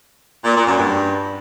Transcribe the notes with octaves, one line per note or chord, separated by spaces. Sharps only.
A#2
A#2
F#2
G2